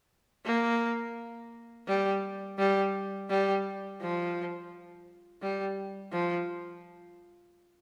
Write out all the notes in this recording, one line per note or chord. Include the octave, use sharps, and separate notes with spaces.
A#3
G3
G3
G3
F3
G3
F3